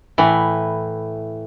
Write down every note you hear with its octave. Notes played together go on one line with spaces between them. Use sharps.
A2 E3